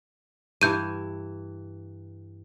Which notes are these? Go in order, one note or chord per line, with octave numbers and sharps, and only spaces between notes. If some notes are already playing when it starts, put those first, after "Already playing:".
G2 E3 G6 D#7